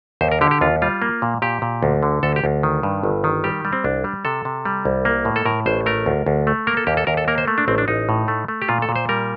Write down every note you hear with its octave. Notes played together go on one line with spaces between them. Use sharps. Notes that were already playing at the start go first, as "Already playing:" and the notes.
D#2 C5
A#4
D3 G4
G4
D#2 F4
G3 F4
A#3
A#2
A#2 G4
A#2
D2
D3
D2 A4
G4
D2
D#3
G2
G1
D#3
G3 G4
G3
C4
C2 D4
G3
C3 A4
C3
G3
C2
A#3
A2
A4
A2 A#4
A1 C5
A3 A#4
D2
D2
A3
A#3 A#4
A4
D#2 G4
A4
D#2 A#4
A4
A#3 A#4
C5
A3
D4
A1 C4
D4
A1 D#4
A2
A3
A3
G4
A#2 F4
A4
A#2
C5
G3 A#4